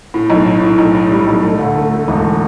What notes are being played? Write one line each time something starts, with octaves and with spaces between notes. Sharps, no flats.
A2
B1
A2
A2
B1
A2
G3
B1
A3
D2
A3
A3
E1